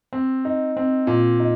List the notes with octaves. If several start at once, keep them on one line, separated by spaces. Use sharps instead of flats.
C4
D#4
C4
A#2
D#4